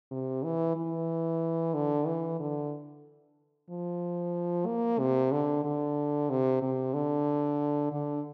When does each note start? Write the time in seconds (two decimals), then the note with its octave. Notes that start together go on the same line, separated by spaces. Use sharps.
0.11 C3
0.44 E3
0.76 E3
1.74 D3
2.06 E3
2.40 D3
3.70 F3
4.66 A#3
4.99 C3
5.32 D3
5.65 D3
6.30 C3
6.62 C3
6.94 D3
7.92 D3